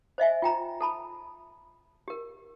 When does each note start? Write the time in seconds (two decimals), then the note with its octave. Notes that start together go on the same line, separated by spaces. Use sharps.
0.18 C5 D#5 E5 G#5
0.42 F4 G5 A#5
0.81 A4 A5 B5
2.08 G4 A#4